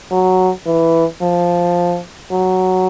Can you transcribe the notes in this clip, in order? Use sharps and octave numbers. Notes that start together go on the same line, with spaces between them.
F#3
E3
F3
F#3